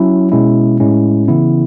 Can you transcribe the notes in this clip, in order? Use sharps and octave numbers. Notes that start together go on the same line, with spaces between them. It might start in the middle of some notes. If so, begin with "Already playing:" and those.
Already playing: F#3 C#4 E4
B2 G#3 C#4 E4
A2 G#3 C#4 E4
C#3 E3 B3 E4